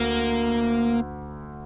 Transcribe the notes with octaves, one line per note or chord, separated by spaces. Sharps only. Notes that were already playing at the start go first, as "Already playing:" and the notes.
Already playing: D2 A#3